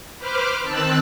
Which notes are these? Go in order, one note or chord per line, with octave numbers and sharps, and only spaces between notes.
B4 C5 B5 D6 F6
D#3 C4 A5 E6 F#6